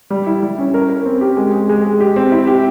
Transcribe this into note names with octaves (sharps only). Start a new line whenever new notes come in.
G3
E4
G3
C#4
A#4
A#4
C4
G4
G#3
G#3
G#3
G#3
G4
C4
E4
G4